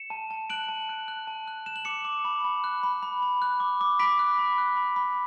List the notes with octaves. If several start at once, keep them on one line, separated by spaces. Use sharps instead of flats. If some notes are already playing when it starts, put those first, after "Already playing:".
Already playing: C#7 E7
A5
A5
F#6 D7 F#7
A5
F#6
F#6
A5
F#6
F#6 E7
F#7
D6 C#7 E7
D6
B5
B5
F#6
B5
B5
B5
F#6
D6
D6
B5 B6 D7
F#6
B5
F#6
B5
B5